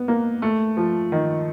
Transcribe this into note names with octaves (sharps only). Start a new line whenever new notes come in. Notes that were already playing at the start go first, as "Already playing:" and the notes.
Already playing: B3
A#3
A3
F3
D#3